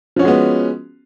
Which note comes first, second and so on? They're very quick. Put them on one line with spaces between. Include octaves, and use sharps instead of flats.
F3 C#4 F#4 G#3 B3